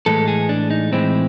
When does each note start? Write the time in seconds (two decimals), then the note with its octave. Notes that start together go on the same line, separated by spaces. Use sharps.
0.06 A2 E3 G#3 A4
0.28 G#4
0.49 D4
0.71 D#4
0.92 A2 E3 G#3 C4